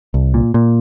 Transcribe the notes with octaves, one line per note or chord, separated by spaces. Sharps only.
C2
A#2
A#2